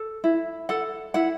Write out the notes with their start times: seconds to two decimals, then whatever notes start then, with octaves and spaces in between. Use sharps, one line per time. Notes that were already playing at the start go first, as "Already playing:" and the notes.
Already playing: A4
0.24 E4
0.69 A4 F#5
1.14 E4 F#5